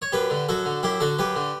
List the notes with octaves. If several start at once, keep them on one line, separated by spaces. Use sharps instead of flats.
C#5
F#2 G4 B4
D3
F#2 F#4 A4
D3
F#2 E4 G4
D3 F#4 A4
F#2 G4 B4
D3